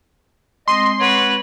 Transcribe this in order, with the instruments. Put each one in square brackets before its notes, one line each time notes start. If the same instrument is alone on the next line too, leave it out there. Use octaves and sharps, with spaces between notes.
[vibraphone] G#3 C4 [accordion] D#5 [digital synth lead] C6
[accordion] F#4 C#5 [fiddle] B4